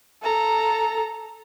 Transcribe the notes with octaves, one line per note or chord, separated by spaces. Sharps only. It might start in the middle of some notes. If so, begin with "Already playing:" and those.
A4 A#5